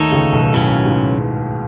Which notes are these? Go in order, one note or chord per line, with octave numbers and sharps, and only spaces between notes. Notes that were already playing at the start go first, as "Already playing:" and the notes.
Already playing: D#2 D#3 A3 D#4 A4 C#5
C#2 C#3
B1 B2
A2 C#3 F#3 C#4
G#2